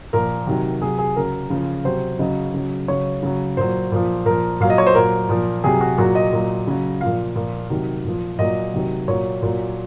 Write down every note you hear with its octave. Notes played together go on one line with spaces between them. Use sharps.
A#2 F3 A#4
C3 D#3 F#3
C3 F#3 G#4
G#4
C#3 F#3 A#4
C#3 F3
C3 F#3 C5
C#3 F#3 D#5
C#3 F#3
C#3 F#3 C#5
C#3 F#3
A#2 F#3 C5
A#2 F3
A#2 F3 A#4
A#2 F#3 F5
D#5
C#5
C5
A#2 F#3 A#4
A#2 F3
C3 F#3 G#4
F#4
A#2 F#3 F#4
D#5
A#2 F#3
C#3 F#3
A#2 F3 F5
A#2 F3
C3 D#3 F#3
A#2 F3
A#2 F#3 D#5
C3 D#3 F#3
A#2 F#3 C#5
A#2 F#3